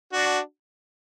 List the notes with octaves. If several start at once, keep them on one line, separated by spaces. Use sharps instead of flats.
D4 F#4